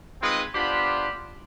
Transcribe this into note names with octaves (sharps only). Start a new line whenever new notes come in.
G#3 C4 D#4 F4 B4 D#5
B3 D4 F4 G4 C5 B5